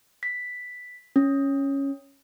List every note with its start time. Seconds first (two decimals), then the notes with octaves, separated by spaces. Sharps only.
0.23 B6
1.16 C#4